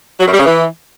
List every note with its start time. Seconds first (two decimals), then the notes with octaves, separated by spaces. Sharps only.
0.20 F#3
0.26 F#2
0.32 G3
0.38 C#3
0.44 E3